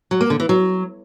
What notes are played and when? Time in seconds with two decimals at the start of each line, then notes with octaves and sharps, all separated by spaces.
0.11 F#3
0.21 A#3
0.30 D3
0.40 E3
0.49 F#3